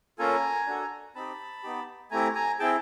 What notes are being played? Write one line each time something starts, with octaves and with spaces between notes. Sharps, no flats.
A#3 C#4 F4 A4 G#5 A#5
D4 F#4 A4
C4 D#4 G4 A5 B5
B3 D#4 G4
A3 C4 E4 G4 G#5 A#5
G#5 A#5
C4 E4 G#4 G5 A5